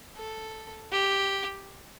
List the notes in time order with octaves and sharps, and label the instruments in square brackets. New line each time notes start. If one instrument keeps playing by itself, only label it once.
[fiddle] A4
G4